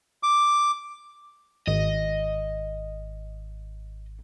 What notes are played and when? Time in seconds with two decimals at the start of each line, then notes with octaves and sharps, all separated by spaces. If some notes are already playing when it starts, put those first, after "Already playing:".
0.23 D6
1.67 G#1 D#5